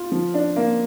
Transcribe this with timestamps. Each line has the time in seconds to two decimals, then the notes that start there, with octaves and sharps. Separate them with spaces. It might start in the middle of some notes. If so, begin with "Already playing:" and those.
Already playing: F4
0.12 F3
0.34 D4
0.56 A#3